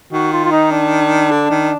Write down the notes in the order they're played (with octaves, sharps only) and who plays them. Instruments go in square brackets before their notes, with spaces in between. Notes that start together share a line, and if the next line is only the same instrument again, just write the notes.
[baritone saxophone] D#3 [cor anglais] F#4
[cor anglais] F4
F4
D#4
D4
[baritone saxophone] D3
D#3